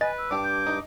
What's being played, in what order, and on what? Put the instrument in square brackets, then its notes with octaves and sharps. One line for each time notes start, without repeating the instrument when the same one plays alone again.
[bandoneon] B4 [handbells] D#5 A6 [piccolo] G#5
[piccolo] E6
[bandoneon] G2 D6 [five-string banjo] D4 G4
[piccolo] G6
[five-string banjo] D#4